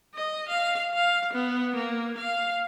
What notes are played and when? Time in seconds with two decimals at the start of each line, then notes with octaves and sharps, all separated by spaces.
0.15 D#5
0.48 F5
0.94 F5
1.33 B3
1.75 A#3
2.17 F5